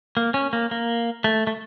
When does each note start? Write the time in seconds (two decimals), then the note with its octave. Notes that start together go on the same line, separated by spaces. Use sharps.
0.17 A#3
0.34 C#4
0.53 A#3
0.71 A#3
1.24 A3
1.47 A3